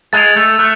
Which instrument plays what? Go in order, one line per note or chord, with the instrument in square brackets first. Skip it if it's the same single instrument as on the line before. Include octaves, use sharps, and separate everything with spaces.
[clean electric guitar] G#3 [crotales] A6 F7
[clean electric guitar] A3
[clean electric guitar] A3 [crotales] F#6